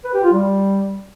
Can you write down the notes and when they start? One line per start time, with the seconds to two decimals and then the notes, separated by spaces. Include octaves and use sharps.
0.04 B4
0.14 G4
0.23 F4
0.32 G3